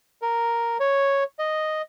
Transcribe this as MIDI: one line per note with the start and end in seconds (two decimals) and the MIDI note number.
0.22 0.77 70
0.80 1.24 73
1.39 1.82 75